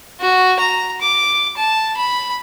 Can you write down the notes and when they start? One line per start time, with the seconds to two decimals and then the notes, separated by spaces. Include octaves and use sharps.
0.21 F#4
0.60 A#5
1.01 D6
1.57 A5
1.97 B5